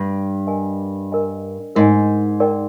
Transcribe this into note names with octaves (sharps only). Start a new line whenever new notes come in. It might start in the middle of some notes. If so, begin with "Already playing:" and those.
Already playing: G2
A#4 D#5 G#5
A#4 D#5 G#5
G#2 A#4 D#5 G#5
D#4 A#4 D5 G5